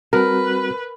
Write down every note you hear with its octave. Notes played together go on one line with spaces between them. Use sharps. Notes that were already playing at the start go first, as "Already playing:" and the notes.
G3 C4 F#4 A#4 B4